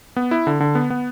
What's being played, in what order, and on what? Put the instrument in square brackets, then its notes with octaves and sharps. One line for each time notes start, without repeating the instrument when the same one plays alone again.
[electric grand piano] B3
E4
D3
D3
B3
B3